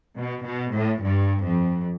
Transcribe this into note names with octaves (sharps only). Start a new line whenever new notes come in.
B2
B2
A2
G2
F2